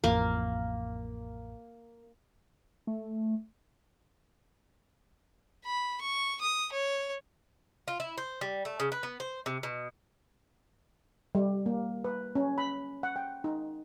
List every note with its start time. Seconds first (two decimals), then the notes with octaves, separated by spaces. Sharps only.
0.04 A1 F2 A#3
2.87 A3
5.65 B5
6.01 C#6
6.41 D#6
6.72 C#5
7.88 F4
8.00 E4
8.18 C5
8.41 G3
8.65 A3
8.80 C#3
8.92 B4
9.03 B3
9.20 C5
9.46 C3
9.63 B2
11.35 G3
11.66 A#3
12.04 B4
12.35 C#4
12.58 B5
13.03 F#5
13.16 G5
13.44 D#4